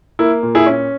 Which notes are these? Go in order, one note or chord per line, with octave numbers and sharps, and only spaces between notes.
A#3 E4
A#2
E4 G#4
C#4